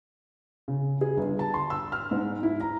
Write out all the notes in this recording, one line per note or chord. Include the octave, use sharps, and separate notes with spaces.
C#3
G#4
G1
A5
C6
E6
F6
G#2
E4
A#5